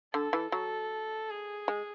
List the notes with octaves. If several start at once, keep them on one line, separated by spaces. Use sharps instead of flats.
D3 A4
E3
F#3 A4
G#4
G#3